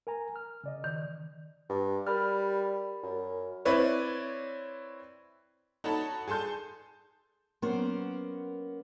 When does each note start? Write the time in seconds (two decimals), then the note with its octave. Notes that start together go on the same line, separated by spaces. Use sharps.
0.07 A#4 G#5 A#5
0.36 F6
0.64 C#3 D5 D#5
0.84 D#3
1.69 G2
2.07 G3 A#4 B5 F6
3.03 F#2
3.65 C4 E4 B4 C#5 D5
5.84 D#4 F#4 A4 C#5 A5 B5
6.28 G#4 A4 A5 C6 G6
7.62 F#3 A#3 B3 C#4 A#4 C5